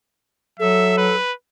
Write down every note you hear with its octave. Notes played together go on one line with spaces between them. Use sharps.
F#3 A4 E5
B4